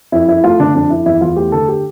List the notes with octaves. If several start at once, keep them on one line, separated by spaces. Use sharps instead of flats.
F2 E4
F2 E4
A3 F4
D3 D4
F2 D4
F2 E4
E2 E4
E2 F4
A3 G4
D3 A4
G4